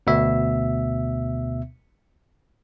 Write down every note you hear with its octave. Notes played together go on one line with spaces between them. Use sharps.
D2 B2 B3 E5